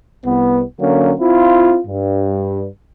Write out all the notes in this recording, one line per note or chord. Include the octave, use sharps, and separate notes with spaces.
C2 B3
D3 F#3 A#3 C#4
C4 E4 F4
G2